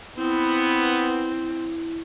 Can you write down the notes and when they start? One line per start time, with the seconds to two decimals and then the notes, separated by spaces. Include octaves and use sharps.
0.17 B3 C4 E4